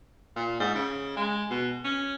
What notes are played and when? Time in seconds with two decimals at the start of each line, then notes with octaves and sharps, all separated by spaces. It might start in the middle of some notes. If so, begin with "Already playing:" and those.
0.36 A#2
0.60 G#2
0.75 C#3
1.17 G#3
1.50 B2
1.84 C#4